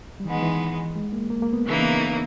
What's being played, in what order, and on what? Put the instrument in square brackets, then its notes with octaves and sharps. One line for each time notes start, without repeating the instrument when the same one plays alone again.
[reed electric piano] G3
[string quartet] D#3 G#3 B3 [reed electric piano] E3
[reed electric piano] E3
G#3
A#3
A#3
A#3
B3
[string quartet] C#3 E3 A#3 D#4
[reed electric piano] B3